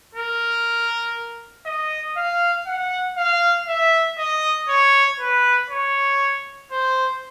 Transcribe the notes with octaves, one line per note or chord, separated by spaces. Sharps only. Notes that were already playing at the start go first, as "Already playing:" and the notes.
A#4
D#5
F5
F#5
F5
E5
D#5
C#5
B4
C#5
C5